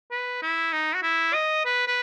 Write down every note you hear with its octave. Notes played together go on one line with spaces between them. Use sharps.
B4
E4
D#4
F#4
E4
D#5
B4
B4